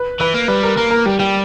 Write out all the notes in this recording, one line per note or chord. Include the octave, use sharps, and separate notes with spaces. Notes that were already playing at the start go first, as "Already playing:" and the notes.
Already playing: B4
E3 B4
A#3
G3 B4
A#4
A#3 A#4
A#4
G3 G4
G3 G4